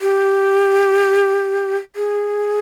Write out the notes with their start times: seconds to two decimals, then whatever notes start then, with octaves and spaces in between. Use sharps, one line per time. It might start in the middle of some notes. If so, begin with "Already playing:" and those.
0.01 G4
1.96 G#4